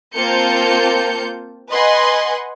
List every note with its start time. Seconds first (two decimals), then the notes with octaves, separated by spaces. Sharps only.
0.14 A#3 C4 F4 A5 G6 C#7
1.70 B4 D#5 F#5 G#5 C6